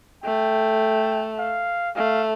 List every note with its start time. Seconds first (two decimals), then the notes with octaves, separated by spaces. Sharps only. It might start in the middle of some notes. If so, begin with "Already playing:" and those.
0.24 A3 G5
1.39 F5
1.96 A3 F5